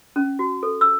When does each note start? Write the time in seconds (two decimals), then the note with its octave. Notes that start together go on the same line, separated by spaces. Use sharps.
0.16 C#4
0.39 F#4
0.63 A4
0.81 E6